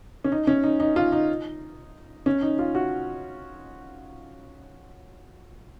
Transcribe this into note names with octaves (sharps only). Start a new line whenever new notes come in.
C#4
D#4
C#4
D#4
D#4
F4
D#4
C#4
D#4
F4
F#4